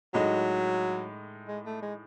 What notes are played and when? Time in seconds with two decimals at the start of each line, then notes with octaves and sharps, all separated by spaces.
0.14 A2 F#3 G#3 D#4
1.48 G#3
1.65 A3
1.82 G#3